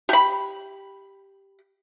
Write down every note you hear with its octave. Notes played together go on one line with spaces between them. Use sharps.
G4 B5